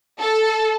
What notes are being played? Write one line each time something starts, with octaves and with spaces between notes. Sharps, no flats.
A4